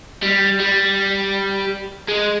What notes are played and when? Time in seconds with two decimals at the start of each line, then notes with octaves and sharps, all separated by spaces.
0.22 G3
0.60 G3
2.09 G#3